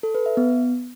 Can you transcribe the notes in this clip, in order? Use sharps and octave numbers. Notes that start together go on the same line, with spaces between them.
A4
B4
E5
B3